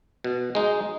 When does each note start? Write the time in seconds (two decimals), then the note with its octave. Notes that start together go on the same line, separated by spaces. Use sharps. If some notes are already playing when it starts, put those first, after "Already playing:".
0.24 B2
0.55 G#3 D#4